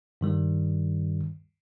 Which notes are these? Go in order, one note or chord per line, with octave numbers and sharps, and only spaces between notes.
G2 D#3 G3